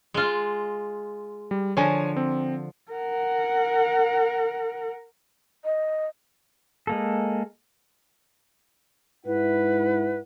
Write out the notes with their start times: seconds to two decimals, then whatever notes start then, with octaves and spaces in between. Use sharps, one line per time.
0.14 G#3 F4
1.51 G3
1.77 D3 F3 C#5 G#5
2.16 C4
2.92 A#4 F#5
5.64 D#5
6.87 G#3 A#3 A4
9.26 G#2 E4 B4 F#5